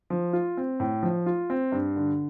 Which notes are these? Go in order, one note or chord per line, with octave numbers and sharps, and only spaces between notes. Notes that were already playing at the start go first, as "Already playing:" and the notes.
F3
F4
C4
A2
F3
F4
C4
G2
D3